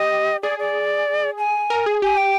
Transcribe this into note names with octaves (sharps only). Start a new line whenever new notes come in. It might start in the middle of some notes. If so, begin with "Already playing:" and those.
Already playing: G4 D#5
G#4 D5
D5
G#5
A#4
G#4
G4 G#5
G5